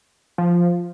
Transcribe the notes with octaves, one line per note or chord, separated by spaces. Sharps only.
F3